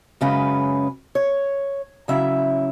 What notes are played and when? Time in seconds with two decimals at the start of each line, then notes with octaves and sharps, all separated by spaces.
0.21 F#2 C#3 G#3 C#4 B4
1.15 C#5
2.08 C#3 F#3 C#4 E4 E5